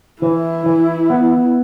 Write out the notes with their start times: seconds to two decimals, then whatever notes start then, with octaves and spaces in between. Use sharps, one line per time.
0.22 E3 E4
0.66 E3
1.10 B3